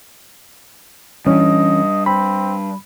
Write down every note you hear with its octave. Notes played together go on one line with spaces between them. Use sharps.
E3 G3 A3 C#4 D4 D#5
C4 B5